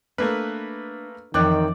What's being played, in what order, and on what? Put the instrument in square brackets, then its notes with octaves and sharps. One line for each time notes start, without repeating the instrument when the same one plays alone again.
[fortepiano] A3 A#3 B4 [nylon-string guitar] D4
[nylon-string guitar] F2 E3 C#5 [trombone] D#3 [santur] D5 [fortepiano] G5 F#6